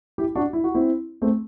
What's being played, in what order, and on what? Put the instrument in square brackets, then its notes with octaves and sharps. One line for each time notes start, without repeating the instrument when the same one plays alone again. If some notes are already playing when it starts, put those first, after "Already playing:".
[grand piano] E4 G4
D4 F#4
E4
F#4
C4 E4
A3 C4